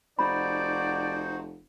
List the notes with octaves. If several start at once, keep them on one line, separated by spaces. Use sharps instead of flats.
F1 D#4 F#4 C5 D5 B5